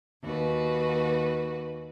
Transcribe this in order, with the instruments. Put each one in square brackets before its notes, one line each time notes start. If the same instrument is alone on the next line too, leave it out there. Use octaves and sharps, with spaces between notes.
[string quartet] D#2 F#4 B4